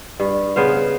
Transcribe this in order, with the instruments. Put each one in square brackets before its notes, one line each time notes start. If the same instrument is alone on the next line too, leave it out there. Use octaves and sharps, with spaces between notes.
[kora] G2
C#3 B3 C5 F5